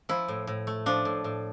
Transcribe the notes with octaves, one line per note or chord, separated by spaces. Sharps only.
F3 E4
A2
A2
A3
F3 D4
A2
A2